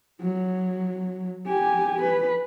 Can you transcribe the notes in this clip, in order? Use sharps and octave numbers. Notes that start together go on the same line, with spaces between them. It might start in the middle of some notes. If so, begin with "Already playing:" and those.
F#3
G4 G#5
B4